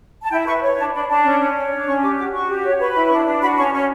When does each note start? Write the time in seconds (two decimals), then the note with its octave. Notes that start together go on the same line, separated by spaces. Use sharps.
0.23 A5
0.31 E4 G5
0.47 B4 C#6
0.62 C#5
0.77 D4 A5
0.93 D4 B5
1.09 D4 A5
1.24 C#4
1.39 C#4
1.55 C#5
1.71 D4
1.79 D6
1.87 C#4 C#6
2.02 G4 D6
2.17 F#4 D6
2.33 F#4 C#6
2.48 G4
2.64 C#5
2.79 B4 C#6
2.95 E4 B5
3.10 D4 C#6
3.25 D4
3.41 F#4 B5
3.57 C#4 C#6
3.72 C#4 C#6